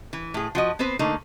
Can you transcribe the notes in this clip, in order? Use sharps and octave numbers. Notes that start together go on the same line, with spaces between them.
E3
A2 G#4
F3 F#4 D#5
B3 C4 B4 C5
D3 A3 A#3 D#4